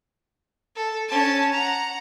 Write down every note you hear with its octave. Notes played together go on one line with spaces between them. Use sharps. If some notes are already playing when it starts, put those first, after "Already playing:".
A4
C#4 A5
F#5 A#5